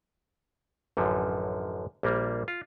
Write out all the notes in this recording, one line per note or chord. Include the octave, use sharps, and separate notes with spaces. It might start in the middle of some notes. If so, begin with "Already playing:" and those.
A1 F#2 D3 F3
A#1 G3 A#3
F4